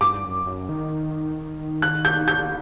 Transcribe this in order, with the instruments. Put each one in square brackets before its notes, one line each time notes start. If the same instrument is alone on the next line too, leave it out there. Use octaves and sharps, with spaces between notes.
[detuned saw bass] G2 [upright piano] D6
[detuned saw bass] F#2
F#2
D#3
[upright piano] F#6
G6
G6